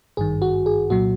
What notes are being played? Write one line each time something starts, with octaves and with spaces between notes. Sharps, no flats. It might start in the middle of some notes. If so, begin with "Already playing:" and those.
G#1 G2 D#3 G#4
F#4
G#4
C2 A#2 F#3 F#4